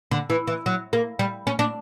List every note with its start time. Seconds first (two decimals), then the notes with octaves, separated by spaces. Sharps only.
0.11 D3
0.30 E3
0.47 E3
0.66 F#3
0.93 A#3
1.19 G3
1.47 C#4
1.59 D4